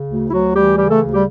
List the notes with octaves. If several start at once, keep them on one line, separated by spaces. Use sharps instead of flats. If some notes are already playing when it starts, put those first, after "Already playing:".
Already playing: C#3
D2
E4
D2 F#3 F#4
E3 G3 G4
C#3 G3 G4
A3 A4
D2
G3 G4